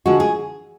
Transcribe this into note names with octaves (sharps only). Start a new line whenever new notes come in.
D3 F3 G#3 F#4
G#4